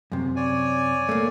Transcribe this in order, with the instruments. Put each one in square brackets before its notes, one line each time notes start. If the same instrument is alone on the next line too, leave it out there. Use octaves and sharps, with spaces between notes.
[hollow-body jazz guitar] F#2 C3
[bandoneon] C#5 D5 G#5
[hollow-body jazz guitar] A3 A#3